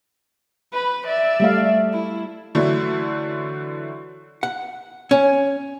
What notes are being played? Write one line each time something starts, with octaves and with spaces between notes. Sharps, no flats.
B4 B5
D5 E5
G3 A3 F5
E4
D3 E3 F#3 A3
F#5
C#4